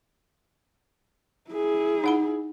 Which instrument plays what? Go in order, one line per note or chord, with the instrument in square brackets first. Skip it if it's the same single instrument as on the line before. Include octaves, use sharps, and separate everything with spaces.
[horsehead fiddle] E4 G#4
[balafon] D#4 F#5 B5